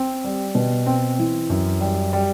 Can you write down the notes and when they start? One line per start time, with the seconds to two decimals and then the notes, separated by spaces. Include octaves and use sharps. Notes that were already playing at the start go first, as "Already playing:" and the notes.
Already playing: C4
0.24 G3
0.55 B2
0.86 C4
1.19 E3
1.50 F#2
1.81 G3
2.13 G3